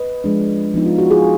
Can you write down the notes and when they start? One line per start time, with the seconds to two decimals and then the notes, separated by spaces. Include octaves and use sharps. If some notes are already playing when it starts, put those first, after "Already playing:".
Already playing: B4 D#5
0.24 F3 G#3 D4
0.74 F3 B3 D#4
0.86 F4
0.98 F#4
1.11 F4 G#4